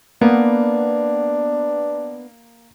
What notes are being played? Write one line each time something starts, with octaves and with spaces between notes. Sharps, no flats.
A#3 B3 D4